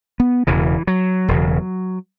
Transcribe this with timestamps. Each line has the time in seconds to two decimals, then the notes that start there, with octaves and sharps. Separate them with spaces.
0.20 B3
0.47 E1 E2 C#3 E3
0.87 F#3
1.28 E1 E2 C#3